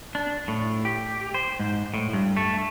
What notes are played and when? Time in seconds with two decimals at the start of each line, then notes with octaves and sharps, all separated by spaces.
0.15 D4
0.48 A2
0.85 G4
1.34 C5
1.60 G#2
1.94 A2
2.13 G2
2.37 A3